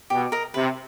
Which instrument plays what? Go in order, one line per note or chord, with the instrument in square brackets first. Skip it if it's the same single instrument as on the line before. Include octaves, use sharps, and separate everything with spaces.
[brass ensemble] B2 [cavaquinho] G4
[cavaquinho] A#4 D#5
[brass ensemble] C3 [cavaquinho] B4